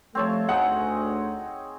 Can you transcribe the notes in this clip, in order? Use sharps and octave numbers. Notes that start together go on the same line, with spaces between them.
F3 G3 A3 C4 C#5 A5
D2 D#4 G#4 F#5